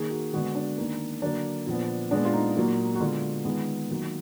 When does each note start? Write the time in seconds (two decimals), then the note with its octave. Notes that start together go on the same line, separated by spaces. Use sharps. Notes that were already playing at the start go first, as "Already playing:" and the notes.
Already playing: D#3 A#3 G#4
0.11 F#4
0.33 D3 G#3 B3 F#4
0.55 D4
0.78 D#3 A#3
1.22 D3 F#3 A#3 D4
1.67 A#2 F3 B3
2.11 A#2 G#3 B3 D4
2.25 F4
2.33 D#4
2.56 A#2 F#3 A#3
2.95 F#4
3.00 D3 G#3 B3 F4
3.45 D#3 G#3 B3
3.90 D#3 F#3 A#3